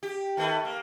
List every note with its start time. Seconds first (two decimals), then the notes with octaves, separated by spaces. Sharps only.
0.03 G4
0.37 D#3 A3 B3
0.65 A#3